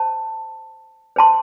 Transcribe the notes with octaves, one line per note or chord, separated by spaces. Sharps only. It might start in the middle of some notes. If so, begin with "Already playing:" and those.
Already playing: C5 A5
C5 A5 C6